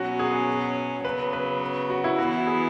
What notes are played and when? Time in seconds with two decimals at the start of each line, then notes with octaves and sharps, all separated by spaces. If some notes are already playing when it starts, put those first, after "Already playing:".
Already playing: B2 F#3 C#4 F#4
0.19 G#4
1.05 C#3 F#3 B3 B4
1.33 B4
1.90 F#4
2.04 E4
2.18 E3 B3 E4 F#4
2.47 G#4